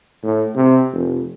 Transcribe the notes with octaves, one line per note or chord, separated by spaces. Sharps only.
A2
C3
F1